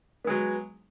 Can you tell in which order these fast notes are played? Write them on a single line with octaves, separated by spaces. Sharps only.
B3 G#3 F#3